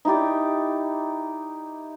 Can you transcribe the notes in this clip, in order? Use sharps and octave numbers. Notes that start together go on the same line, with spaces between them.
D#4 E4 G4 D5